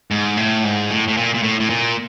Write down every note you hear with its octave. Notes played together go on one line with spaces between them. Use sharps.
G#2
A2
G#2
A2
A2
A#2
A#2
A2
A2
A#2